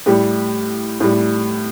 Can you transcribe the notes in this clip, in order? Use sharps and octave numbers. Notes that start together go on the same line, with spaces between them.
A2 G3 G4
A2 G3